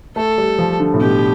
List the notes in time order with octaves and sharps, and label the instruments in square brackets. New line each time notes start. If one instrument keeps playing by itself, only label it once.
[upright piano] A3 [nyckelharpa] A4
[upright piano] G3
F3
D3
A2
[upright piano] B2 [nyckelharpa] G4